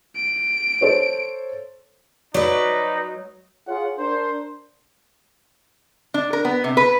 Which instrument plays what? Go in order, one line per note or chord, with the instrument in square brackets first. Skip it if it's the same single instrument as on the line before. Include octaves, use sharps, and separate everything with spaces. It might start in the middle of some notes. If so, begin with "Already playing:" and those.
[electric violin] D7
[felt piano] A4 C5 C#5
[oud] F#3 [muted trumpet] D#4 [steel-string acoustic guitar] B4 D5
[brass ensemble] F4 G#4 C#5 F#5
D4 A#4 C5
[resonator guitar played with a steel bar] D4
A#4
B3
C3
B4